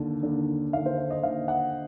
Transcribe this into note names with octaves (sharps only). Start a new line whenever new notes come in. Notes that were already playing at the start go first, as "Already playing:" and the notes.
Already playing: D#2 D3
D#2 D3
D#2 D3 F5
C5
C5
D#5
D#2 D3 F5
F#5